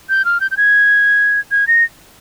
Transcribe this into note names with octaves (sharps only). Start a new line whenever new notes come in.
G6
F6
G6
G6
G#6
G#6
A#6